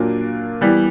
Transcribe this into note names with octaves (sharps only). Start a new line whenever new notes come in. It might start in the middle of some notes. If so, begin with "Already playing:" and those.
Already playing: A#2 F#3 A#3 D4 F4
E3 G3 B3